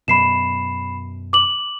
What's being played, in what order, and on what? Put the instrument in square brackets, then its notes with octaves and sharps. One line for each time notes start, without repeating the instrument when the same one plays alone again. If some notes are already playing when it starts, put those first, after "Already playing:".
[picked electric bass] F#2 B2 [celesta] B5 C7 E7
[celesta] D6 F#7